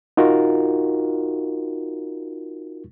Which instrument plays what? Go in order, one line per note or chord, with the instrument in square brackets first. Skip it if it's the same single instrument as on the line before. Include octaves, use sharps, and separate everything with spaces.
[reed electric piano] D#4 F4 F#4 A#4